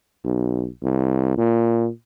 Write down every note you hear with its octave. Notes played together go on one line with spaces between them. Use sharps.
B1
C2
A#2